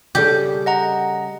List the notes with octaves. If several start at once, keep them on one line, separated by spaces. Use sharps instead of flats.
C#3 G3 G4 A4
D#5 F#5 A#5